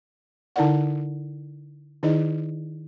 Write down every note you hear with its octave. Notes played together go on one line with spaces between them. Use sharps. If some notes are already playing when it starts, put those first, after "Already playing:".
D3 D#4 E4 A#4 D5 F#5
D#3 D#4 E4 G#4 D5 D#5